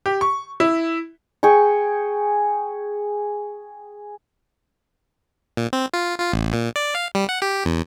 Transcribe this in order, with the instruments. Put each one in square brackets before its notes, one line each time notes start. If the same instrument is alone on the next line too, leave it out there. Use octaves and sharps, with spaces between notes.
[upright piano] G4
C#6
E4
[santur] G#4 G5 C#6
[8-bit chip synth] A#2
C4
F4
F4
A1
A#2
D5
F5
G3
F#5
G4
E2